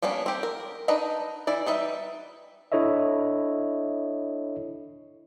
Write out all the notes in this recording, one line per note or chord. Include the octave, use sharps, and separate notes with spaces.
G3 A#3 B3 C#4 D4
C4 G4
A#4
D4 D#4 B4 D#5 A#5
E3 E4 D5
G3 D#4 B4 E5
D4 E4 A4 C#5 D#5 E5